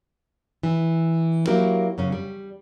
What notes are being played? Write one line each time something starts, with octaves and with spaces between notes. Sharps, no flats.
E3
F#3 A#3 E4 F#4 G4 A#4
F#2 C#3 C#4
G3